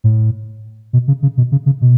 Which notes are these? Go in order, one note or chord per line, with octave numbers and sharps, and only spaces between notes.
A2
B2
C#3
C#3
B2
C#3
C#3
B2